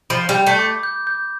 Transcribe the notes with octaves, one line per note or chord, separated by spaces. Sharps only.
F3 B5
G3
G6
A3
D6
G6
G6